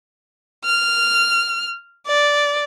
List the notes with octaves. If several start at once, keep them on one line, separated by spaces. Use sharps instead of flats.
F6
D5